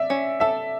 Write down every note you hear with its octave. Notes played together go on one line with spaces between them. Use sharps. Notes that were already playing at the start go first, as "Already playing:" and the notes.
Already playing: D5 E5
C#4
A4 E5